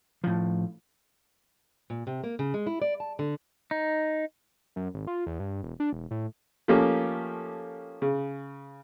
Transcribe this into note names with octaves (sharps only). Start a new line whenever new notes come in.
A2 F3
A#2
C3
A#3
C#3
G#3
E4
D5
A5
D3
D#4
F#2
G#1
F4
E2
G2
E1
D4
E1
A2
F3 A3 A#3 C#4 G4
C#3